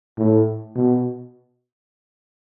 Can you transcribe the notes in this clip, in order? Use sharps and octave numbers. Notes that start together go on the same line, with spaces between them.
A2
B2